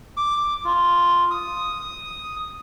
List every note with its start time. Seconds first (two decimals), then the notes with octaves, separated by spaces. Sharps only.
0.17 D6
0.65 F4
1.31 D#6